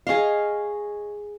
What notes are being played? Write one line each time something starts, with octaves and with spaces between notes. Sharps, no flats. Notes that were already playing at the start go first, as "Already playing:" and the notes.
G#4 C#5 D#5 F5